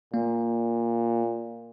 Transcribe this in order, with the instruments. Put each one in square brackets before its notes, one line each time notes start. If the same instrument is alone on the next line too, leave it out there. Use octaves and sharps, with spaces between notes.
[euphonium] A#2 [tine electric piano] A#3